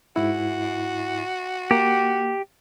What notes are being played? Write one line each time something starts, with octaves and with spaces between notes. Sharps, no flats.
G#2 E4 F#4
A#3 G4